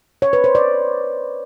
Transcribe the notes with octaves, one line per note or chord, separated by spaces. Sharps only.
C#5
B4
C5
D5